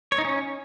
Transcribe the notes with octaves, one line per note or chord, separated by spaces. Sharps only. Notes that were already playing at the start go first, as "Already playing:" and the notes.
C#5
D#4
C#4